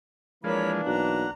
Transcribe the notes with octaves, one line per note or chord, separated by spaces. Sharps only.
E3 F3 G#3 A#3 D4 A#4 C#5 B5
B1 F#5 A#5